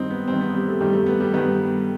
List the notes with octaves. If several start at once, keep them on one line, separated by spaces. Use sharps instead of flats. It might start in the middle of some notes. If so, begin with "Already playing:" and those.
Already playing: G2 D#3 C4 D#4
B3
G2 D#3 C4
B3
G3
A3
G2 D#3 G3
A3
B3
G3
G2 D#3 B3